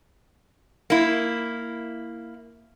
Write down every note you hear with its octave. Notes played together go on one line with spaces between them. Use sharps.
A#3 E4